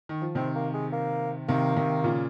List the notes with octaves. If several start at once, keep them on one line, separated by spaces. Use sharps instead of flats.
D#3
F3
C3 D#3 C4
A#3
G#3
A#3
C3 D#3 A#3
C3 D#3
A#2 C#3